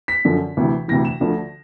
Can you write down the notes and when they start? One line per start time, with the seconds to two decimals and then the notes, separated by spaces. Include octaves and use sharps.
0.08 B6
0.25 F#2 D3 F3
0.57 D2 C3 E3
0.88 D2 C3 E3 A#6
1.05 E7
1.20 D2 D3 F3